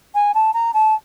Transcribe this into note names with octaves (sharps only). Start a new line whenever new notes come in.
G#5
A5
A#5
A5